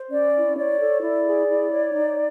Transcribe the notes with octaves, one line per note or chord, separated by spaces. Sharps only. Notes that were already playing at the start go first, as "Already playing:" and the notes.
Already playing: C5
C#4 D5
E4
C#5 D5
A4
E4 D5
G#4
E4
C#5
D#4